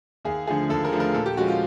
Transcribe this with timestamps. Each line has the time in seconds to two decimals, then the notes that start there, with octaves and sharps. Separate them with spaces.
0.25 D#2 G#4
0.47 D3 F3 A3 G#4
0.69 D#2 A4
0.84 A#4
0.92 D3 F3 A3
1.00 A#4
1.14 A#2 A4
1.26 G4
1.37 F3 G#3 C#4 F#4
1.48 F4